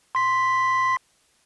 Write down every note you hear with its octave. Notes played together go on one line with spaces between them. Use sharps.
C6 B6